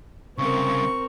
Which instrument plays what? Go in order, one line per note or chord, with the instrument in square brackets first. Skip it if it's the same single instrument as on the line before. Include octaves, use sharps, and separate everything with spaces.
[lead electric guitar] C2 C#3 [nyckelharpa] C4 A#4 [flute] C#6